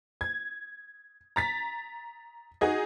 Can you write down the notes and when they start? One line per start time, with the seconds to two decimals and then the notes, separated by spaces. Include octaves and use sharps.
0.21 G#6
1.36 A#5 A6 B6
2.61 D#4 F#4 G#4 D#5